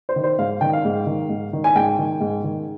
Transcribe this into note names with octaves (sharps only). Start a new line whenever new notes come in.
C5
D#3
C5
G#2 F5
D#3 G5
F5
G#2
D#3
G#2
D#3
G#5
G#2 G5
D#3
G#2
D#3